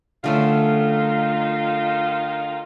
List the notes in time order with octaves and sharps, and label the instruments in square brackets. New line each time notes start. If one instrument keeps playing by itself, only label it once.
[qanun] D3 A3 C#4 [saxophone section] D#3 F4